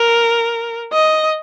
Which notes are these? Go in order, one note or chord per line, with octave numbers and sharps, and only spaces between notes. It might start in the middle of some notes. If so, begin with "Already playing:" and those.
Already playing: A#4
D#5